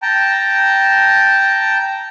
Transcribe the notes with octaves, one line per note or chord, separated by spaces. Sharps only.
G5 A5 A#5